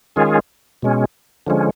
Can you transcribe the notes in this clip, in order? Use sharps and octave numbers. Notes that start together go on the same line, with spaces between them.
D#3 G#3 C#4 F4 G#4
B2 G#3 C#4
D3 F3 G#3 C#4